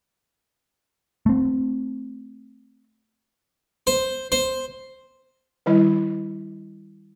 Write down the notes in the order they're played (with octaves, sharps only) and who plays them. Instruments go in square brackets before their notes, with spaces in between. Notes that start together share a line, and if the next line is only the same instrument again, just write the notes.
[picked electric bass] A3 C4
[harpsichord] C5
C5
[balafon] D#3 G3 E4 D#5